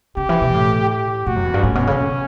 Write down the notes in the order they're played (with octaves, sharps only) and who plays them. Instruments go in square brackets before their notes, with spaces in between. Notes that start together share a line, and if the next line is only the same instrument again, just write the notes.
[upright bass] C#3 [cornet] G4
[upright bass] E3
B2
A2
[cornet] G4
[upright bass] A2 [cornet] F#4
[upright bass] F#2
E2
G2
[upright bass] A2 [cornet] C#4
[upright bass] B2
C#3
C#3